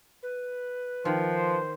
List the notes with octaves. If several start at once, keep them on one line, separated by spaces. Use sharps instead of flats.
B4
D#3 F3 C5